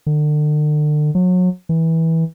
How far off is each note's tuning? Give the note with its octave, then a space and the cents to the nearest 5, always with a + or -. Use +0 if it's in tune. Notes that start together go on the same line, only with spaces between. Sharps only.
D3 +40
F#3 -30
E3 -20